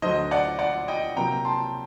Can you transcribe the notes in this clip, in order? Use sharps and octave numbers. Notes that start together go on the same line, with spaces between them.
D2 D3 F#3 C5 D#5
D5 F#5
D5 F#5
D#5 G5
C3 F#3 A#3 G5 A#5
A5 C6